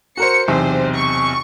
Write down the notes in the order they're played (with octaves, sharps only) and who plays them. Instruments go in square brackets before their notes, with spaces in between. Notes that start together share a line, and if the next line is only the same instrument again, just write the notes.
[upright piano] F#4 A#4 C5 [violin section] C#7
[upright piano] B1 E2 C3 [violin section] C5
[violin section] C#6